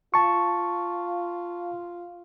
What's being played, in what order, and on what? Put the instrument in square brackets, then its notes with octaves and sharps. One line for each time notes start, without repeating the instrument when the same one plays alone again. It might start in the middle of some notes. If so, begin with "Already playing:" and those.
[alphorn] F4 [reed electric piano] A5 C#6